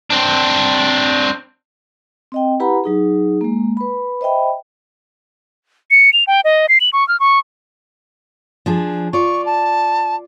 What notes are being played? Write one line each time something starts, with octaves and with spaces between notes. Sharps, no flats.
C4 D4
C4 D#5 G5
E4 G4 B4 F#5 A#5 B5
F#3 D#4 G#4
G#3 A#3
B4 B5
C5 D#5 E5 G5 B5
C#7
F7
G5
D#5
C7
F#7
C#6
F6
C#6
F3 D4 G#4
F4 D5 C#6
A5